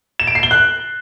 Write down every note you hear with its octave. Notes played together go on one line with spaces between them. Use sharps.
E7
D7
C7
G7
F#6